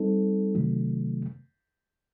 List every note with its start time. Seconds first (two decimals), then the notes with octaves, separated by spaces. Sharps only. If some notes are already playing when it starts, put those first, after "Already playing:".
Already playing: G3 C4 D#4 A4
0.55 C3 D#3 F#3 A3